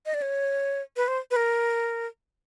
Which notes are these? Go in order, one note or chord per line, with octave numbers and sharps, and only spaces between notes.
D#5
D5
C#5
B4
C5
B4
A#4